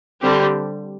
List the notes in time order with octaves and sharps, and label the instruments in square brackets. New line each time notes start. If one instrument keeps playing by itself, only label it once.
[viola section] D3 G3 C4 G4